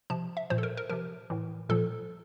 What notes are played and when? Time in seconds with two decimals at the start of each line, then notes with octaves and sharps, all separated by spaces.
0.10 C3 F3 A5
0.37 E5
0.50 A#2 F3 C5
0.58 A4
0.63 A#4
0.77 A#4
0.90 C3 F3 A#4
1.30 A2 E3
1.69 A#2 F3 A4